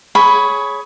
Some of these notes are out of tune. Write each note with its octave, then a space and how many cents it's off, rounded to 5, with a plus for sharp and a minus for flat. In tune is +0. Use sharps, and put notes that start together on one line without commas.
G#4 +20 C#5 +0 B5 +0